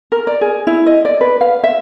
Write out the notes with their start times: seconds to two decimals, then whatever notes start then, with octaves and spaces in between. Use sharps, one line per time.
0.12 A#4
0.27 D5
0.41 G#4
0.67 E4
0.86 D#5
1.05 D5
1.21 B4
1.41 F5
1.64 E5